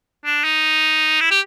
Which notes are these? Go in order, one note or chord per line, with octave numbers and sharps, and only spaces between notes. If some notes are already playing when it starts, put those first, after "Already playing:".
D4
D#4
E4
G4